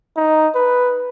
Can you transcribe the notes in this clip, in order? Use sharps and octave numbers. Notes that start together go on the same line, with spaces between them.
D#4
B4